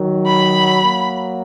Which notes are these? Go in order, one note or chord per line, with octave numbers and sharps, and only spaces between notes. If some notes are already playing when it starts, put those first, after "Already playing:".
Already playing: D#3 F#3
B5
F#3 A#3